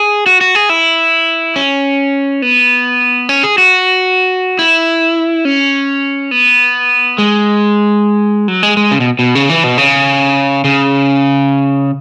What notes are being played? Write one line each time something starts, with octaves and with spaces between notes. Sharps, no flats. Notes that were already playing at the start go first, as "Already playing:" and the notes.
Already playing: G#4
F#4
F#4
G#4
E4
C#4
B3
C#4
G#4
F#4
E4
C#4
B3
G#3
F#3
G#3
G#3
C#3
B2
B2
C#3
E3
B2
C#3
C#3